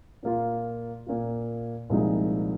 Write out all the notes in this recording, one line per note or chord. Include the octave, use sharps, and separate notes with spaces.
A#2 A#3 F4
A#2 A#3 F4
C2 A#2 F3 G#3 D#4